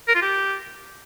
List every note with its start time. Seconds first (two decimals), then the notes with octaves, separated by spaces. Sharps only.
0.08 A#4
0.15 F4
0.22 G4